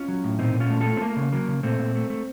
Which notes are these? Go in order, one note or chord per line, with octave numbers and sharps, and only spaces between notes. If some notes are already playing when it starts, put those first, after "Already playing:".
Already playing: C#4 F4
F#3
A2
A#2 C4 D#4
A#2
C#4 F4
A3
F4 A4
A3
C4
A3 A#3
C#3
F#3 A#3
C#3
A#2 A3 C4
A#2
A3
A3